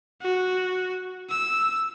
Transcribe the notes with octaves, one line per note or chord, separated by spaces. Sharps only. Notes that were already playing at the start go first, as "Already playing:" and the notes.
F#4
E6